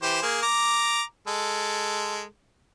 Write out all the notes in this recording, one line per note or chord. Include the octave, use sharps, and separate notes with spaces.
E3 G4 C5
A#3 G#4
A#5 D6
G#3 A4